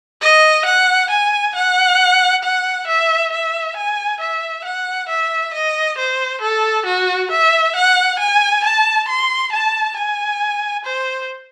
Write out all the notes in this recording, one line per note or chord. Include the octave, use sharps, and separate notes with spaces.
D#5
F#5
G#5
F#5
F#5
E5
E5
G#5
E5
F#5
E5
D#5
C5
A4
F#4
E5
F#5
G#5
A5
C6
A5
G#5
C5